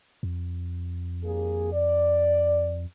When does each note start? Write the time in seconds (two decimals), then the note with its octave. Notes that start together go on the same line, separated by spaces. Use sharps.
0.23 F2
1.23 D#2 A#3 G#4
1.72 D5